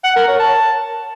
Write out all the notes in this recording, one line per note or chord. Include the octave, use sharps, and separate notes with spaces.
F#5
A#4
C#5
A5